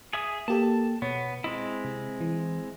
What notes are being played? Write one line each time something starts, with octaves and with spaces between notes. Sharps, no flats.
G#4 E5 D#6
A#3 G4 A4 A5
B2 B3 C#5
G#3 C4 E4 D#5
C3
E3